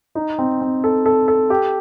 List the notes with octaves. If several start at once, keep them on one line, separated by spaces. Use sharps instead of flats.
D#4
C4
C4
A4
A4
A4
G4